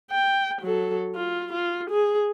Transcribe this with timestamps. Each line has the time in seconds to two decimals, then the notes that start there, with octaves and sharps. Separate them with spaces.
0.11 G5
0.62 F#3 A4
1.15 F4
1.53 F4
1.90 G#4